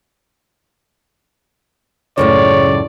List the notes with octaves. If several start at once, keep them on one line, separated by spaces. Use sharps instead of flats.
C#2 F#2 A2 C#3 C#5 D5